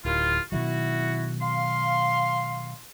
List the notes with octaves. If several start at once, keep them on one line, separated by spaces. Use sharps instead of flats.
D1 D#2 E4 F4
B2 D#3 F#3 E4 F#4
F5 C6